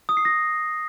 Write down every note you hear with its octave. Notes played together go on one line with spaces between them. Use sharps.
D#6
C7
A#6